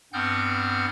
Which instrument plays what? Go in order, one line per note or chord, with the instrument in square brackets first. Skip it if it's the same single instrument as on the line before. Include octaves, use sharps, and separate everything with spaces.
[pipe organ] G2 B3 C4 F#5 F6 G6